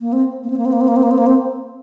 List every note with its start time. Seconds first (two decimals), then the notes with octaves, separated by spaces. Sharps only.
0.01 A#3
0.13 C4
0.43 A#3
0.50 C4
0.58 A#3
0.65 C4
0.72 A#3
0.81 C4
0.88 A#3
0.96 C4
1.03 A#3
1.11 C4
1.18 A#3
1.26 C4